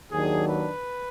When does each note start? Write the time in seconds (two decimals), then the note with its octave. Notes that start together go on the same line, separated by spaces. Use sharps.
0.11 D#2 D#3 F#3 D4 G#4
0.48 B4